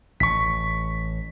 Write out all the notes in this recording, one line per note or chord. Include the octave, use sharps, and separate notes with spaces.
A1 C#6 B6